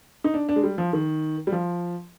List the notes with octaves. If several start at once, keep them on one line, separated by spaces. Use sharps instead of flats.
D#4
D4
D4
G#3
G3
F3
D#3
G3
F3